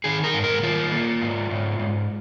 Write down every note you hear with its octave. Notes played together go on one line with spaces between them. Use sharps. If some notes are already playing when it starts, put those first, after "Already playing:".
D#3 G#4
A#4
G#2
A#4
D#3 F4
A#3
G#2
G#2
G#2